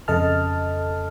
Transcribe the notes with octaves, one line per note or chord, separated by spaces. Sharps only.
F2 C#3 A4 D#5 A5 F6